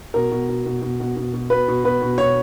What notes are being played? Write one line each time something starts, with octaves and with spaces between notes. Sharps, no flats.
B2 A#4
B2
B2
B2
B2
B2
B2
B2
B2 B4
B2
B2 B4
B2
B2 C#5